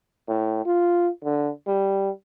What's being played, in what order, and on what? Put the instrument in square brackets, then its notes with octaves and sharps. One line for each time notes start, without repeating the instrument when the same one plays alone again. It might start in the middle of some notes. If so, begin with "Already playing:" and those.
[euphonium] A2
F4
D3
G3